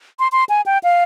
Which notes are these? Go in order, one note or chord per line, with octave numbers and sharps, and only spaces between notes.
C6
C6
G#5
G5
F5